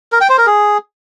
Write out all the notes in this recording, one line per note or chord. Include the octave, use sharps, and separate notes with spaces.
A#4
G5
C5
A#4
G#4